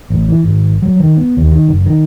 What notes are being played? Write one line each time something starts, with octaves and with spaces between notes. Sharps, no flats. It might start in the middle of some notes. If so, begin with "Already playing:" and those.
A1
E3
G#1
F#3
D#3
B3
D#2
D#3
F#1
D#3